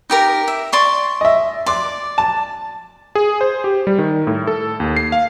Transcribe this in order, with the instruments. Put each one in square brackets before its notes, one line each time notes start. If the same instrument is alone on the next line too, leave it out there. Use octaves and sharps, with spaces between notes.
[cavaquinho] D#4 G4 A#4
E5
D5 C6 C#6
[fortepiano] D#5 E5
[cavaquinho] D5 [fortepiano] C6 D6
[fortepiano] A5
[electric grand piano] G#4
C5
G4
G3
D#3
A2
A4
D#2
C7
F5